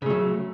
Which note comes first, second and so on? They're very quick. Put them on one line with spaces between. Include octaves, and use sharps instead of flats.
C#3 A3 F#3